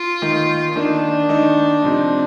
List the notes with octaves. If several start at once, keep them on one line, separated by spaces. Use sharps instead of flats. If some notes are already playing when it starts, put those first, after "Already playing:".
Already playing: F4
D#3 A#3 D#4
D#3 A#3 D4 D#4
D#3 A#3 D#4
C3 F3 C4 D#4